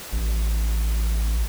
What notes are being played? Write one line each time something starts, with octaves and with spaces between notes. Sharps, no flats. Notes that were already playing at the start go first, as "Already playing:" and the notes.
A1